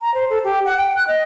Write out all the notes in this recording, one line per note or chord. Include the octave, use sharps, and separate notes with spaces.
A#5
C5
A4
G4
F#5
G5
F#6
D#5